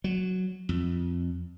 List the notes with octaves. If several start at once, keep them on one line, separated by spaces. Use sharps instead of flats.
F#3
F2